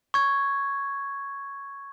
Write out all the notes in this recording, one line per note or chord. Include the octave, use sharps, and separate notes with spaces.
C#6 G#6